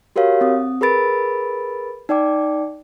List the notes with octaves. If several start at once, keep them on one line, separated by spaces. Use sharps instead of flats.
F#4 G4 A#4 C#5 F5
C4 D#6
G#4 A#4 B4 B5 A6 D7
D#4 D5 G5 D6